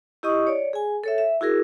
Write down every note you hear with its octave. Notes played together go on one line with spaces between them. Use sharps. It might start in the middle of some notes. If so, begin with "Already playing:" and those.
E4 G4 D#5 C#6 D#6
C#5 D5
G#4 G#5
A4 C#5 E5
E5
E4 F#4 G#4 A#4